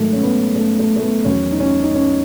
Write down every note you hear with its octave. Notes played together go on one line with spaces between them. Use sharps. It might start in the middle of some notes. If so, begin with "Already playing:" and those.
Already playing: G#2 D#3 F#3 A3
C#4
B3
A3
A3
A3
B3
E2 D#3 F#3 C#4
D#4
C#4
D#4
C#4